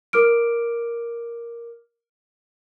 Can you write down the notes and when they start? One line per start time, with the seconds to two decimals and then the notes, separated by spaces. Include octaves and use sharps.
0.13 A#4 D6 F6 D7